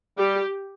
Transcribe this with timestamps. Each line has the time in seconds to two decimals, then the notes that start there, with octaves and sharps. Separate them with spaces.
0.17 G3 G4